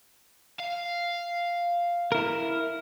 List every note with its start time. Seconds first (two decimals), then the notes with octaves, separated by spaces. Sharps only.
0.60 F5
2.12 E4 A#4